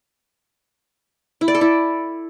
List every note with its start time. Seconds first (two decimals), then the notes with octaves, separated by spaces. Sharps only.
1.41 E4
1.48 D5
1.55 A4
1.61 E4